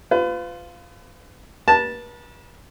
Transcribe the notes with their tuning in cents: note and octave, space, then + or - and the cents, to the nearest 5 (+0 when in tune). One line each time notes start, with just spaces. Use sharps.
F4 +0 B4 +35
B4 -40 A5 +0